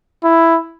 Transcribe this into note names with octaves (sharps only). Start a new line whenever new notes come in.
E4